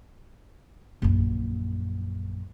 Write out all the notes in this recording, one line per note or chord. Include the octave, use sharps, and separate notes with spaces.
A#1 F#2